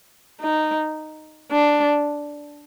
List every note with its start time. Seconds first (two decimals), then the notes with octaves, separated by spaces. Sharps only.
0.41 D#4
1.52 D4